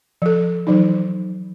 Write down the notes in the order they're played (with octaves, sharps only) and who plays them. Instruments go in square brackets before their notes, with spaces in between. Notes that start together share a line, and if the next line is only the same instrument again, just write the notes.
[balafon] F3 A4
E3 F#3 D#4